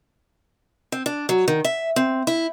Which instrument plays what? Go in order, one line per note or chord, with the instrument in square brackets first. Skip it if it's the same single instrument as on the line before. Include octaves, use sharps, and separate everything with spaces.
[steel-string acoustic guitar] C4
D4
F#3
D#3
E5
C4
E4